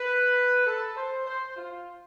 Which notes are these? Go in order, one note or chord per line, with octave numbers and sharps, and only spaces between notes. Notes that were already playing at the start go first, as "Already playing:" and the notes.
Already playing: B4
A4
C5
C5
F4